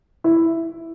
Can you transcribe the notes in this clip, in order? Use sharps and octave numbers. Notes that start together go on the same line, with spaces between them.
E4